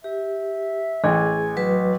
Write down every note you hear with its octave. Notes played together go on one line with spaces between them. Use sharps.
G4 E5
A1 G#4 G#5
F#3 F#4 B4